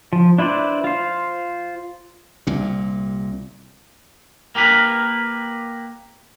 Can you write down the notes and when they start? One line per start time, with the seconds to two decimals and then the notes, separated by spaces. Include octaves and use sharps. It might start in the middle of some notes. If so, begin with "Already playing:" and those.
0.13 F3
0.38 D4 E4 B4 C5 D5
0.84 F4 C5
2.47 C2 A#2
4.55 A#3 G4 A#4 B4